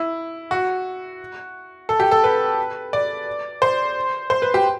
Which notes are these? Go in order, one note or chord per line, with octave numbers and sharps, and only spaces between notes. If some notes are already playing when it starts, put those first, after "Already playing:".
Already playing: E4
F#4
A4
G4
A4
B4
D5
C5
C5
B4
G4